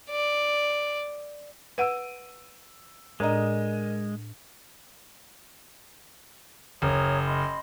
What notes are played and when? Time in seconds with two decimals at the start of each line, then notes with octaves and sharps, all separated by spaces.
0.10 D5
1.78 B4 F#5 E6 D7 D#7
3.20 A2 G#3 D4 A#4 D5 D#5 A#5
6.82 F#1 C#5 A#5 D#6
7.27 D#5 B5 C6